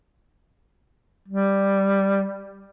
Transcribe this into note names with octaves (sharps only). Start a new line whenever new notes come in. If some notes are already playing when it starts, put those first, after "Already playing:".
G3